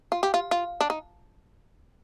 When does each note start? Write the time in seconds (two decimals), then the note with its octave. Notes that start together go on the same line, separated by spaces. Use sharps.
0.12 F4
0.23 G4
0.34 F4
0.51 F4
0.81 D4
0.90 D#4